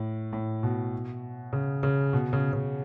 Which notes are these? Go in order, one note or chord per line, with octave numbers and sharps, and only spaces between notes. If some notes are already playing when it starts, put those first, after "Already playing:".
Already playing: A2
A2
B2
C#3
C#3
B2
C#3
C#3